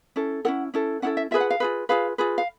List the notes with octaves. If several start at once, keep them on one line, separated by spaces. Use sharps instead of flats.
C#4 E4 A4
C#4 E4 A4 F#5
C#4 E4 A4
C#4 E4 A4 F#5
E5
F4 G#4 B4 E5
F#5
F5
F4 G#4 B4
F4 G#4 B4 F5
F4 G#4 B4
F5